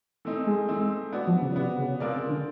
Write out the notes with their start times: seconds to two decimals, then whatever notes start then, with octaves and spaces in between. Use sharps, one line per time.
0.25 E3 A3 C4 D#4
0.46 G#3
0.68 E3 A3 C4 D#4
1.12 B3 D4 F#4
1.27 F3
1.42 C#3
1.56 C3 B3 D4 F#4
1.78 C#3
2.00 C3 G#3 C4 F4 A#4 D5
2.15 C#3
2.29 D3